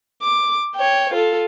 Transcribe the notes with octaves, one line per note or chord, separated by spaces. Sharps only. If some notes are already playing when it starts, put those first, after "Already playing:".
D6
C#5 G5
F4 A4